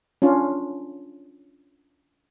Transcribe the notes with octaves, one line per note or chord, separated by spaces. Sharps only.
C#4 D4 F4